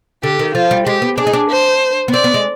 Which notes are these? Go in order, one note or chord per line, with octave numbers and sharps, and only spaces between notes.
D3 G4
D#3
F3 F4
G3
G#3 G4
B3
D4 G#4
D#4
D4
C5
B3
C4 D5
B3
G#3